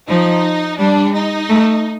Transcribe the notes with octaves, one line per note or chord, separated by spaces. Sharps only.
F3 D#4
G3 D4
D#4
A3